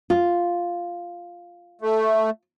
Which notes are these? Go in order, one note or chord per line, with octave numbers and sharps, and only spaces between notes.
F4
A3